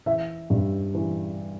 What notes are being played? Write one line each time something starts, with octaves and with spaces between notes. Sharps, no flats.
E3 E5
G2
E3